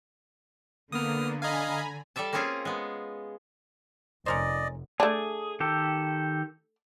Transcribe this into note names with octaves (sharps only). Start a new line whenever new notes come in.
D3 A#3 B3 D#6 F6
D#5 F5 G#5 A#5 B5
G3 A4 D5 E5 A5
A#3 C4 C#4 F4 G#4
G#3 B3
F1 C#4 A#4 C5 D5 D#5
A3 D4 G#4
D#3 G4 A4